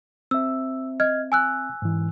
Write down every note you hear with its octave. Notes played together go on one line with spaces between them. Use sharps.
C4 E5 E6
D#5 F6 G#6
G#5 E6 F#6
G#2 E3